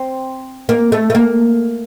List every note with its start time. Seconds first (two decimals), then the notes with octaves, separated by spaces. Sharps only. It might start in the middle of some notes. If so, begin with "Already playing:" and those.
Already playing: C4
0.69 A#3
0.92 A3
1.10 A3
1.15 A#3